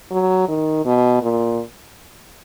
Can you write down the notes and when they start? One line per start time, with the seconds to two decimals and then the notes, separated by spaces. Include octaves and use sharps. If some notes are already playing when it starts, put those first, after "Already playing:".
0.11 F#3
0.49 D#3
0.85 B2
1.22 A#2